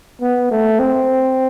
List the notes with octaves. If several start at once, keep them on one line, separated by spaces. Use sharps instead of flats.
B3
A3
C4